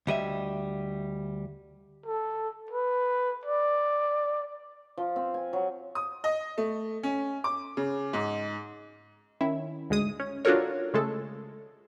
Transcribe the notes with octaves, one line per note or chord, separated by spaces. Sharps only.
D2 G3 D#5 E5
A4
B4
D5
F3
C4
G#5
F#3
D#6
D#5
A3
C#4
D6
C#3
G#2
D#3 C#4 E4
D2 G#2 G#3 D#6
C#4
D4 F4 F#4 A4 A#4 C#5
C#3 G#3 A3 A4